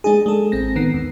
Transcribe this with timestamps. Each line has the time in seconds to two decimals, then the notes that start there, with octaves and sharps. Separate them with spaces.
0.04 G#3 D4 D#4 G#4
0.26 G#3 A4
0.52 A1 C4 A#6
0.76 D#3 B3 C7
0.94 D#2